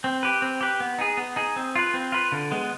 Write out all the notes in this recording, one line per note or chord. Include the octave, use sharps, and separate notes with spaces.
C4
G4 B4
C4
G4 B4
B3
D#4 G#4
B3
D#4 G#4
C4
F4 B4
C4
F4 B4
D3
G#3 B3